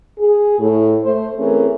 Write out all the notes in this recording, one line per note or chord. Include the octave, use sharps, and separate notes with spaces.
G#4
A2
A3 C5
E3 A3 C4 C#4 G#4 A#4